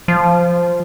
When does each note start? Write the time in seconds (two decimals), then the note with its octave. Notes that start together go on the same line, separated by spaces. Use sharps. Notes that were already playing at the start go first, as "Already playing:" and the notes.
0.08 F3